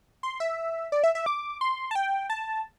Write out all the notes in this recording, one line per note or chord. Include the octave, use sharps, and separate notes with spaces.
C6
E5
D5
E5
E5
D6
C6
A5
G5
A5